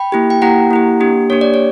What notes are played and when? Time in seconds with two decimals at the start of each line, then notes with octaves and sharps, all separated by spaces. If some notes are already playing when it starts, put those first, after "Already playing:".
Already playing: G5 B5
0.12 A#3 E4 G4
0.30 G5
0.42 A#3 E4 G4 F#5 A#5
0.71 A#3 E4 G4
1.00 A#3 D4 G4
1.30 A#3 D4 G4 C#5
1.41 D5
1.54 C#5